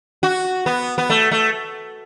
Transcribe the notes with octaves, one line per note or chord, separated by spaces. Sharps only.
F#4
B3
B3
A3
A3